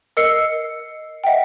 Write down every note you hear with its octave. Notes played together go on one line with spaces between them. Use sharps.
A#4 D#5 E6 C7 C#7
D#5 E5 F#5 G5